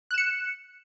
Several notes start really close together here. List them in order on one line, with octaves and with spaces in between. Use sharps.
F#6 E7 C#7